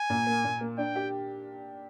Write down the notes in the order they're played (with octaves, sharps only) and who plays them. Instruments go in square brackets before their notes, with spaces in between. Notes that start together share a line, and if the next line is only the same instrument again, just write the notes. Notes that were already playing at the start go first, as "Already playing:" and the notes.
Already playing: [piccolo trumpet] G#5
[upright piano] A#2
A#3
A#2
A#3
[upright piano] D4 [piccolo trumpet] G5
[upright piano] G4